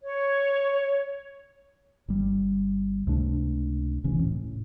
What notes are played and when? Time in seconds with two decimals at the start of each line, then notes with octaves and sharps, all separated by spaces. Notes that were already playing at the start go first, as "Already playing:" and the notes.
0.02 C#5
2.08 G1 G3
3.07 C#2 C3 A3 D4
4.04 E1 C3 E3 C#4
4.24 A2